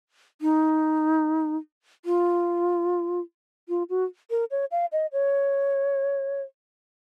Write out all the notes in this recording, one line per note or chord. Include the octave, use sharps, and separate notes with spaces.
D#4
F4
F4
F#4
A#4
C#5
F5
D#5
C#5